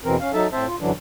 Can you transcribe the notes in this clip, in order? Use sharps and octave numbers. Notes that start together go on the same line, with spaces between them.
E2 B2 E3 C4 A#4
C#4 F5
F#3 D#4 A4 E5 A5
A2 C4 C5 E5 A5
F4
F#2 D3 E3 F#3 D4